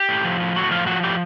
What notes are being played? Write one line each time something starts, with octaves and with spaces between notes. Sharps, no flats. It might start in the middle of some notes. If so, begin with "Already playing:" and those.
Already playing: G4
A2
F3
A2
A2 F#4
F3 F4
F3 F#4
A2 G4